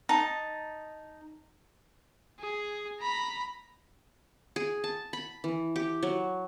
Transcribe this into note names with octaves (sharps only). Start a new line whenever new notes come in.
D#4 A5
G#4
A#5 B5
G#4
A5
B5
E3
G4
F#3